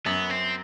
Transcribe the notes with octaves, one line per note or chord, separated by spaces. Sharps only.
F#2 B3
C4